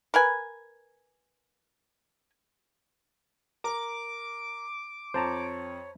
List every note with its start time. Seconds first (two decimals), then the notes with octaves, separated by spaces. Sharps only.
0.14 A#4 B4 G#5
3.64 A#4 D6
5.14 F2 C5 C#5 A5 A#5